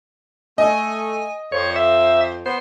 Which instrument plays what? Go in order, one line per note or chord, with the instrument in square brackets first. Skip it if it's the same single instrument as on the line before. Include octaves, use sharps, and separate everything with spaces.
[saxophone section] A3 [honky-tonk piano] D#5 [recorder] G#5
[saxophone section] F2 [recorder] C5 [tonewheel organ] C#5
[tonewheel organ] E5
[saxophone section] B3 [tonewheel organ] C5